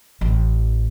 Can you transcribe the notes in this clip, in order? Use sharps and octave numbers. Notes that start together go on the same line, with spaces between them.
A1